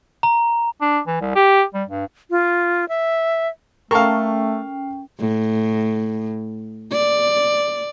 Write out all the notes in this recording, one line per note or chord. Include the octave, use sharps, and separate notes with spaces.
A#5
D4
E3
C2
G4
G3
G2
F4
E5
A3 C#4 A4 A#4 F5 G5 C#6
A2
D5